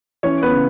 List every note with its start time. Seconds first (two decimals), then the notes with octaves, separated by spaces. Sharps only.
0.23 E3 C#4 C#5
0.42 B3 B4
0.51 C#3